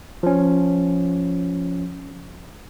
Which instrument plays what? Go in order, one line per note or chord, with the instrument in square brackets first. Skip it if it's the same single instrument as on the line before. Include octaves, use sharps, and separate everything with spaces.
[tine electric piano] F3 C#4